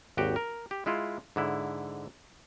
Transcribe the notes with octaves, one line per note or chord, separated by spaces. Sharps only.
G#1 D#2 F#4 G4 G5
A#4
G4
G#3 E4 F4
G#2 D3 E4